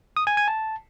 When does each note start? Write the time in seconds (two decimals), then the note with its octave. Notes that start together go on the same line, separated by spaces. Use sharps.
0.17 D#6
0.27 G#5
0.37 G#5
0.48 A5